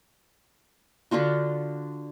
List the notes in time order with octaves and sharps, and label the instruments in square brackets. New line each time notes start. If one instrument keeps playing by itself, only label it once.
[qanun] D3 D4 F4 F#4